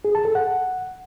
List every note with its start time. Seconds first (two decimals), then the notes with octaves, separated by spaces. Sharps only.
0.05 G#4
0.15 A5
0.25 A4
0.35 F#5